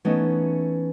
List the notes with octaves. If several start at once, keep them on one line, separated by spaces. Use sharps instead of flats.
E3 A3 B3 C#4 D#4